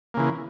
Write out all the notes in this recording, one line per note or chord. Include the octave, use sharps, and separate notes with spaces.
C#3 E3 A#3